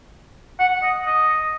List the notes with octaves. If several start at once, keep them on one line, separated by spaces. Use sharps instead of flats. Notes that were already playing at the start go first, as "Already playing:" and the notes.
F#5
D#5
D#5